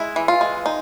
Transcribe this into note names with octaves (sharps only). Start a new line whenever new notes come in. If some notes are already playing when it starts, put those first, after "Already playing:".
Already playing: G#3 E4
E3
F4
G#3
D#4